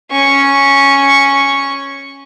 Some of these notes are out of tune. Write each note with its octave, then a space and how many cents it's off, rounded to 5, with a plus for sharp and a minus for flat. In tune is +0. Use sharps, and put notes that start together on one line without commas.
C#4 +0 C#6 +0